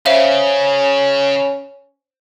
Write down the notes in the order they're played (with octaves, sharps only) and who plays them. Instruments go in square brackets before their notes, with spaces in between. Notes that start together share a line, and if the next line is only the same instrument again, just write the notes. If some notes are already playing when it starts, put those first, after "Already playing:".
[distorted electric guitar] C#3 [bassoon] C#4 [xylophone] C5 E5 F5